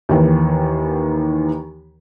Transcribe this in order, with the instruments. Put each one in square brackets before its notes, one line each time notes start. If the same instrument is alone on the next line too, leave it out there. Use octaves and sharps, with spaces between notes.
[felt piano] D#2 D#3 E3